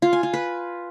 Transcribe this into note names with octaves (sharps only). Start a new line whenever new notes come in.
F4
G#5
F4
B4